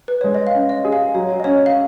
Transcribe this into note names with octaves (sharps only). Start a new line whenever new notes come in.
B4
G#3 C#5
D#5
F5
C#4
D#5
G#4
F5
F#3 C#5
D#5
C#4 C#5
F5